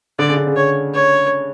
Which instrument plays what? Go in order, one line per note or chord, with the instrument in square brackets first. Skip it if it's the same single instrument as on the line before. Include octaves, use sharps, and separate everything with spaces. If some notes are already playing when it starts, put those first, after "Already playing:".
[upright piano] D3 [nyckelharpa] D5
[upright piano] C#3
D3
C#3
[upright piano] D3 [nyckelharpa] C#5
[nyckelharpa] C#5